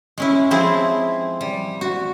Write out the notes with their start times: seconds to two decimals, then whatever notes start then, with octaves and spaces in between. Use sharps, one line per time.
0.18 G#3 C#4 E4
0.51 F3 C4 E4 G#4
1.41 G3
1.81 F#4